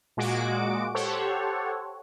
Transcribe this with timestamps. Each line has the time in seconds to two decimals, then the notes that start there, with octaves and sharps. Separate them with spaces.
0.17 A#2 G#3 F#4 D6 D7
0.94 G4 A4 C5 C#5 F#5